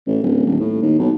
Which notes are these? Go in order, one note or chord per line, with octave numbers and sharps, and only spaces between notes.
A1
D1
D#1
A2
D#2
B1